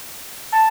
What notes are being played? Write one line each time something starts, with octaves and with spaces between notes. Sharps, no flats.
A5